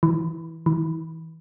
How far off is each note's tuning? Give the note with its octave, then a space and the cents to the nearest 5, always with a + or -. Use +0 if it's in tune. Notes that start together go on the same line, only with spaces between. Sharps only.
E3 -15
E3 -35